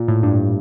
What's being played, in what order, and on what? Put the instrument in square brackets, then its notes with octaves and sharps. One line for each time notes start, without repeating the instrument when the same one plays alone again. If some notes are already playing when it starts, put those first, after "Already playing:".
Already playing: [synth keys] A#2
A2
G2